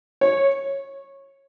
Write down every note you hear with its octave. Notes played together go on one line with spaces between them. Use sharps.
C#5